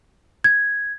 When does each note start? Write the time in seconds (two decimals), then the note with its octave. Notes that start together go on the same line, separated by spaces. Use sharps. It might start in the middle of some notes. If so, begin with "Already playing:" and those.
0.44 G#6